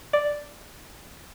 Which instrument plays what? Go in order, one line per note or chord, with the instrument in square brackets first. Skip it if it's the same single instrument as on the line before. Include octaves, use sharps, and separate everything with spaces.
[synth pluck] D5